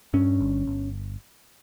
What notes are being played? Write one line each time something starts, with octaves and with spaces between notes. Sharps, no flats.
G2 C#4
G1
G1